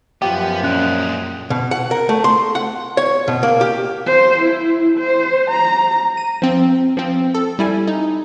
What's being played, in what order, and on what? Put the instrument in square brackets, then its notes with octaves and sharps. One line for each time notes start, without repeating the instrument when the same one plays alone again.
[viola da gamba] F#2 F3 [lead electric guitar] B3 [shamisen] G4
[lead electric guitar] A#2 G#3 [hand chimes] C#4 F#6
[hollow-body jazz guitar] B2
F#5
A#4
A3
C6
F#5
C#5
B2
A#3
G4
[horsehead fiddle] C5
E4
C5
A#5
[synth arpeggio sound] D#7
F3 C4
F3 C4
A4
G3 E4 G#5
D#4